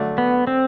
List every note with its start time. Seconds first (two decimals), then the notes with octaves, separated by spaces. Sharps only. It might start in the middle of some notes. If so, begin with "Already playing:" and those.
Already playing: D3 F#3 A3 D4
0.18 B3
0.47 C4